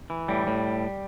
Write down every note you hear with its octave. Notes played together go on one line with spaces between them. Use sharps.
E3
A2 G3
A2